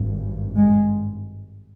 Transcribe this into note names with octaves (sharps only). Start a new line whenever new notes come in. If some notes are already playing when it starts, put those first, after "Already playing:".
Already playing: G#1 G2
G#3